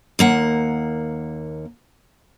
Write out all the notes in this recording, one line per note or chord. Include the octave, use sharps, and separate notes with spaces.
D#2 A#3 F#5